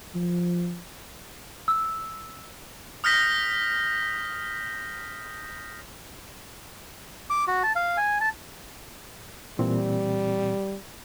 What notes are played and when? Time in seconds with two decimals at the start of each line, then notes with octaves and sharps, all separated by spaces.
0.15 F3
1.68 E6
3.04 D#6 F6 G6 A#6 B6
7.30 D6
7.48 F#4
7.63 A5
7.76 F5
7.97 G#5
8.21 A5
9.59 A#2 E3 G3 C4